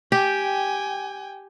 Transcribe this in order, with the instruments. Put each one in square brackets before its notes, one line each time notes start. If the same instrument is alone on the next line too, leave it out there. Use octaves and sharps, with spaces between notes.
[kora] G4 [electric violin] G5 G#5